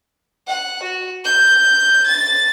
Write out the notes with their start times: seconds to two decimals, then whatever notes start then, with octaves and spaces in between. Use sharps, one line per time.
0.47 F#5
0.82 F#4
1.24 G6
2.06 A6